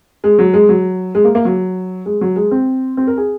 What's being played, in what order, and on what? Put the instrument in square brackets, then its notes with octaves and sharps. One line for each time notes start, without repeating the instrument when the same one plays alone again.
[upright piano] G#3
F#3
G#3
F#3
G#3
A#3
A#3
F#3
G#3
F#3
G#3
C4
C4
A#4
G#4